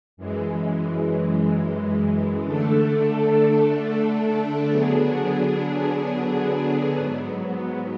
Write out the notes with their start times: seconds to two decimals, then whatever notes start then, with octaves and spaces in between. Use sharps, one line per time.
0.17 F#2 E3 G#3
2.44 D3 A3 D4 A4
4.70 D3 F#3 B3 D4 G#4
6.97 G#2 F#3 B3